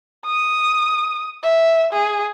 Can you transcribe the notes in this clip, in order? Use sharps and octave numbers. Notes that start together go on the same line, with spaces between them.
D#6
E5
G#4